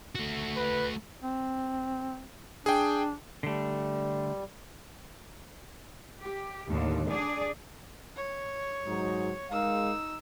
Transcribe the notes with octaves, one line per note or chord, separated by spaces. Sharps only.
A3 F#4
B4
C4
D4 G#4 G5
D3 G3 A3
G4
D#2 A2 D3
D4 G#4 D5
C#5
G#2 F#3 D#4
G#3 D#4 A#4 F5 E6